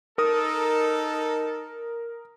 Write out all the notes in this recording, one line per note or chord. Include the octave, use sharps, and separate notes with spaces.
D#4 A4 A#4 D#6